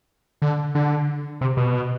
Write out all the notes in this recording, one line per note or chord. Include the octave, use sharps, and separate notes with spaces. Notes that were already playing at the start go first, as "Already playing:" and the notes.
D3
D3
C3
B2